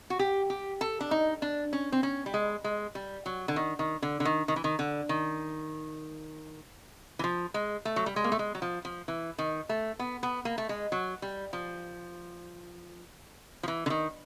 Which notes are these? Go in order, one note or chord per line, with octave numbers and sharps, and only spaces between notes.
F#4
G4
G4
A4
D4
D#4
D4
C#4
C4
C#4
G3
G#3
G#3
G3
F#3
D3
D#3
D#3
D3
D3
D#3
D#3
E3
D#3
D3
D#3
E3
F3
G#3
A3
F#3
G3
G#3
A#3
A3
G#3
F#3
F3
F3
E3
D#3
A3
B3
B3
A#3
A3
G#3
F#3
G3
F3
F3
E3
D3
D#3